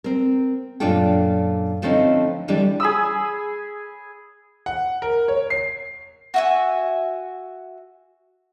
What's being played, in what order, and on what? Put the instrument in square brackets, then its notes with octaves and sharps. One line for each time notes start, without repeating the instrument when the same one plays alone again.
[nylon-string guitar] C4 A#4
F#2 A#2 D4 F4 A4 G5
D3 F3 A3 C4 C#4 D#4
D3 E3 G3 D4 G4
[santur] G#4 B5 D#6 E6
[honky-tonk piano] F#5
A#4
C#5
C7
[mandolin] F#4 E5 G#5